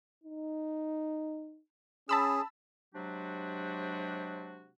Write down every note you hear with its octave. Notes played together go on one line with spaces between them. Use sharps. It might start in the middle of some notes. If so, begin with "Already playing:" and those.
D#4
C#4 G#4 A5 B5 E6
C3 F#3 G#3 D4 F#4 G4